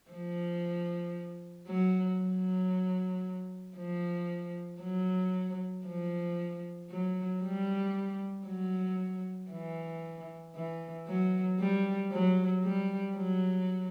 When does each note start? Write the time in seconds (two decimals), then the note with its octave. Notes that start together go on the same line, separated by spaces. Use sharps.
0.11 F3
1.68 F#3
2.20 F#3
3.77 F3
4.81 F#3
5.85 F3
6.90 F#3
7.42 G3
8.46 F#3
9.50 E3
10.55 E3
11.07 F#3
11.59 G3
12.12 F#3
12.63 G3
13.16 F#3